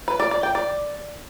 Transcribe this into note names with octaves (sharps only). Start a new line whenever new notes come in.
B4
D5
D5
G5
D5